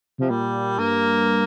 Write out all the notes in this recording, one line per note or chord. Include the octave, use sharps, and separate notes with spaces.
C3 F3
A#2 G3
G2 A#3